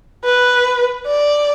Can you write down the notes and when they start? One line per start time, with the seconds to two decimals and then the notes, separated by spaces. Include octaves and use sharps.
0.25 B4
1.06 D5